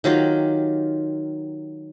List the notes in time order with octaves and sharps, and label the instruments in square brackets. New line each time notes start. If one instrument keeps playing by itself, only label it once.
[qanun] D#3 F#3 F4 G4